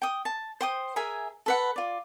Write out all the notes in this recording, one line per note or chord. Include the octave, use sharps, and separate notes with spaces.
G5 D#6
A5
C5 G5 D#6
G#4 A#4 E5 G#5
A4 B4 F#5
F4 D5